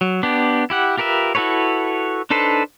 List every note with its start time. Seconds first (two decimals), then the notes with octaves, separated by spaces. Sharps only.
0.01 F#3
0.23 B3 D4 G4
0.70 E4 G4 F#5
0.98 F4 G4 A#4 B4 E5
1.35 E4 F#4 A4 B4 C#5
2.30 D4 D#4 A4 B4 C5